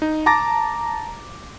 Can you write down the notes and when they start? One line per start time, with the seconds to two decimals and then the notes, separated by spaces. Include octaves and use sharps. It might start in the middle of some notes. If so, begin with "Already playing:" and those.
0.02 D#4
0.26 A5 A#5 D6 A6 A#6